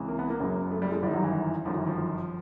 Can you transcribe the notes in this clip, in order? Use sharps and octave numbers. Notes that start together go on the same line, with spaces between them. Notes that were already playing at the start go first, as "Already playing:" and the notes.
Already playing: C#2 C3 E3
A#3
B3
A#3
F#1 F#2 C#3
A3
G3
G#3
G1 F#2 D#3 G3
F#3
E3
G1 F#2 D#3 F3
E3
F3